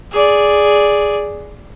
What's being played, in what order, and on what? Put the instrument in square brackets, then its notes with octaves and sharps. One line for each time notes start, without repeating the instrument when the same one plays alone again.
[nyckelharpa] G#4 D5